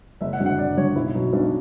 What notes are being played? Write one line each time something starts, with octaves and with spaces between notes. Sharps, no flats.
F#1 E5
F#5
F#2 D3 F#3
F#5
F#1 D5
F#2 D3 F#3 C#5
B1 E4
B2 F#3
B1 D4